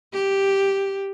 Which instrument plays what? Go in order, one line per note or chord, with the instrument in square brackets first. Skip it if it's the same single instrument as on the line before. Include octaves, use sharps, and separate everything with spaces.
[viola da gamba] G4